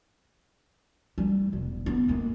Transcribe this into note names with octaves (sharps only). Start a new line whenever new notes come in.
G3
E1 D2
D3 B3
G#3 A#3